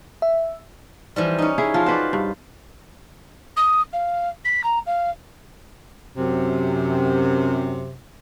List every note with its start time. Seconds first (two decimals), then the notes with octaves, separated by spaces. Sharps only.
0.22 E5
1.16 E3 F3 G3
1.38 C#4 D#4
1.58 E4 G#4
1.74 F3 F4
1.86 F#4 B4 C5 D5
2.13 G2
3.56 D#6
3.93 F5
4.44 B6
4.63 A#5
4.86 F5
6.17 F#2 C3